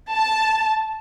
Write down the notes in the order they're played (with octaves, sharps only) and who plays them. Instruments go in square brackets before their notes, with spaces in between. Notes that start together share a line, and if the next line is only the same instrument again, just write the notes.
[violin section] A5